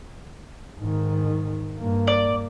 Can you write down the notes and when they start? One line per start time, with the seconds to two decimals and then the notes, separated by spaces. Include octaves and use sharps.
0.80 G#2 D#3
1.78 G2 A#3
2.07 D5